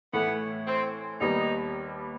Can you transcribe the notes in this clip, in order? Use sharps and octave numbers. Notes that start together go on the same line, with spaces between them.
A2 E3 A3 B3
C4
D#2 D#3 G3 B3 D#4